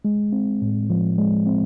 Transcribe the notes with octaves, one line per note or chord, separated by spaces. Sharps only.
G#3
C4
A2
F3
G#3
C4